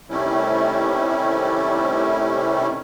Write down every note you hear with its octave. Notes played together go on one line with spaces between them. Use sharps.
C3 D#3 G3 A3 C#4 E4